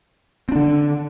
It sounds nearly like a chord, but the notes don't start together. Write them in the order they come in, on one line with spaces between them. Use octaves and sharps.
C4 D4 D3